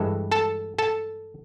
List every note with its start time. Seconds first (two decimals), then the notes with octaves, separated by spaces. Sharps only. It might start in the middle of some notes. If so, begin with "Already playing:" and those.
Already playing: G2 E3 G#3 A4
0.32 A4 A5
0.79 A4 A5